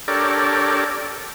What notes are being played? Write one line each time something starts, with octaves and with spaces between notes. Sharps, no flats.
D4 G4 A4 A#4 C#5 D5